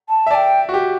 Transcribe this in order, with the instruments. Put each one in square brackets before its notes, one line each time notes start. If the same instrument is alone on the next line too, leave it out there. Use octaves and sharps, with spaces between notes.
[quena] A5
[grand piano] E5
[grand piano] D5 [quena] G5 A5
[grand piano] F#4
G4